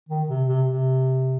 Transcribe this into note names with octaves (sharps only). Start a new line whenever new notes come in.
D#3
C3
C3
C3